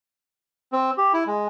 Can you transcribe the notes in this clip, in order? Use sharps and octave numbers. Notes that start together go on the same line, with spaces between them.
C4
G4
E4
G#3